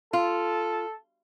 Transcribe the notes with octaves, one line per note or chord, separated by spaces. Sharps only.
F4 A4